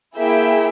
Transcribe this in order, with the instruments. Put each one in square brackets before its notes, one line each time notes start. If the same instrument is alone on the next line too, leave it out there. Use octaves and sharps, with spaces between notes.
[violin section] A#3 E4 G#4 E5 G5